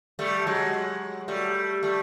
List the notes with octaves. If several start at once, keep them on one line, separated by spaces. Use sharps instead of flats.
G3 A3
F#3 G#3
G3 A3
G3 A3